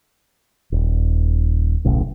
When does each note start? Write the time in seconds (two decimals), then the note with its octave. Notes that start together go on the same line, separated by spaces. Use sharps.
0.72 D#1
1.85 D#1 B1 A2 C#3